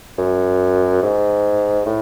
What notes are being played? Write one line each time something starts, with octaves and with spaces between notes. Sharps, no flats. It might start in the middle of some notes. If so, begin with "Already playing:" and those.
F#2
G#2
A2